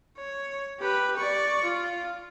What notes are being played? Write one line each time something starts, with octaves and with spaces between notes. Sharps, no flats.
C#5
G4 B4
D5 C#6
F4